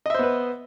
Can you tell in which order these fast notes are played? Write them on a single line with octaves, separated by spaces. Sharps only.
D#5 E5 C5 B3 B4